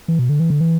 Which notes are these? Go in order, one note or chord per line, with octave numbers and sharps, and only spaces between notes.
E3
B2
D3
E3
D3
E3